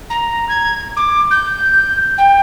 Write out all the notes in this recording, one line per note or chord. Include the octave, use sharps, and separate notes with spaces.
A#5
G#6
D6
G6
G5